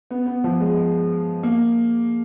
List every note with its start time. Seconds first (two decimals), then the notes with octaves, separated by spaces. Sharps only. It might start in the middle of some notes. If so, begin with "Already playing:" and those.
0.11 B3
0.26 B3
0.44 F3
0.61 G#3
1.43 A#3